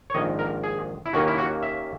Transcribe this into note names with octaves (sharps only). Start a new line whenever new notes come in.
C#5
A#1 G#2 D#3 G#3 D#5
A#4
G#4
E4
D#2 D#3 A#3 C#4 F#4
E4
F#4
E5